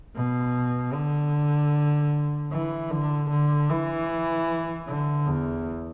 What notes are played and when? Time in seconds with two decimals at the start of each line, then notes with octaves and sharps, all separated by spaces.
0.15 B2
0.93 D3
2.51 E3
2.91 D3
3.30 D3
3.70 E3
4.88 D3
5.27 E2